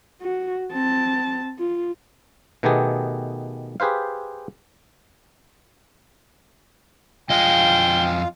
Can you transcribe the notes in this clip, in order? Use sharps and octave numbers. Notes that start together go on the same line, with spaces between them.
F#4
C4 A5
F4
B2 D#3 A3 B3 G4 G#4
G4 G#4 B4 C5 F5
F2 F4 D#5 F5 G5 G#5 G7